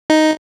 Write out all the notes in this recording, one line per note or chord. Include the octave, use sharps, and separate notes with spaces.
D#4